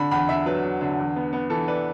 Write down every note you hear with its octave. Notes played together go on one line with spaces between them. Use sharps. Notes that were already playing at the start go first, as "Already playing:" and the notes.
Already playing: D3 B5
E2 B5
D3 E5
F#3 B4
F#3
D3
E2
B3
B3
E3 A4
D4 B4